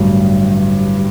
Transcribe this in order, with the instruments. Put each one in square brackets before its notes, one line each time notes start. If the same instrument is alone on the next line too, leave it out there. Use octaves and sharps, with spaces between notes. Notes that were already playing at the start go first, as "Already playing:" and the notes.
Already playing: [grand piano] A1 G2 D3 F#3